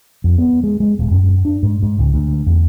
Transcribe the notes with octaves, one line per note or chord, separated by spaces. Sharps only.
F2
B3
G#3
G#3
D#1
F#2
D4
G#2
G#2
C#2
D2
E2